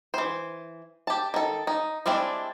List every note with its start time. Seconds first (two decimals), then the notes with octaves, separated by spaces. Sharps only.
0.14 E3 C5
1.07 G4 A5
1.34 D#3 A4
1.67 D#4
2.06 G3 G#3 C4 D4 E4